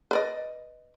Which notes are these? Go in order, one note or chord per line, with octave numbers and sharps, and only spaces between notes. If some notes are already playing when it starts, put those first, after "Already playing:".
B4 D5 D#5